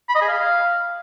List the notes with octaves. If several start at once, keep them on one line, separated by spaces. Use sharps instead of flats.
B5
D#5
G#4
F5